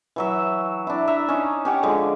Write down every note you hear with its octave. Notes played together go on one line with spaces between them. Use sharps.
E3 F#3 E5
D4 E4
E5 A#5
C#4 D#4
C#4 G4 F#5
D3 F3 G#3